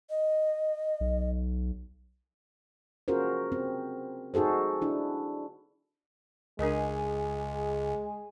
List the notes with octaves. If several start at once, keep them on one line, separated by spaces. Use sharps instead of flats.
D#5
B1
C#4 F4 F#4 G#4 A#4 C5
C4
D#4 F#4 G#4 A4 C5
D4 E4
C#2 G#3 D4 G#4 A#4 D#5 G#5